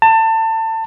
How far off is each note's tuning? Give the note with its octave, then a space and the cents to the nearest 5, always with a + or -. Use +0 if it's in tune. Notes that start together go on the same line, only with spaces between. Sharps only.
A5 +25